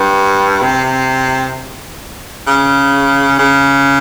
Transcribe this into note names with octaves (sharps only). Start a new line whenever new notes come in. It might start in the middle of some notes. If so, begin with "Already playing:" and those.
Already playing: G2
C3
C#3
C#3